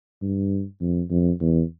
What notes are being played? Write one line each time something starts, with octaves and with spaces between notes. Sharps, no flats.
G2
F2
F2
E2